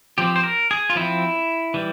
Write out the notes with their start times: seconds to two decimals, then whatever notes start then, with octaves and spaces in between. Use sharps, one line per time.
0.18 F3 C4 G4
0.36 C5
0.44 A#4
0.71 G#4
0.90 F4
0.96 F3 C4 E4
1.74 E3 G3